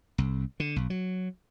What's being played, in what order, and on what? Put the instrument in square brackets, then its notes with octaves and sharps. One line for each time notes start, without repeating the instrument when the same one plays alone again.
[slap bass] C2
D3
B1
F#3